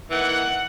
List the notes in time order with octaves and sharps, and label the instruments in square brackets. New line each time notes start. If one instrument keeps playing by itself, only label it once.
[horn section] E3 A#3 D#4 F#5